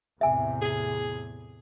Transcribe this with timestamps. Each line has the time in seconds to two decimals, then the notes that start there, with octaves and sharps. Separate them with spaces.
0.21 E2 A2 C3 E5 G#5
0.62 G#4